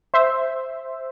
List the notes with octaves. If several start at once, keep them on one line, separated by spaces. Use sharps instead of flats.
C5 E5